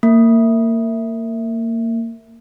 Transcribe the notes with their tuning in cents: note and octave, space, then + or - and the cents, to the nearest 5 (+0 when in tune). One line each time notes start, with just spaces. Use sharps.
A#3 -25